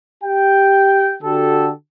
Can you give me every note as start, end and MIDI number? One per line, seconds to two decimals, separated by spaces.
0.23 1.15 67
0.23 1.15 79
1.23 1.70 50
1.23 1.70 66
1.23 1.70 67
1.23 1.70 69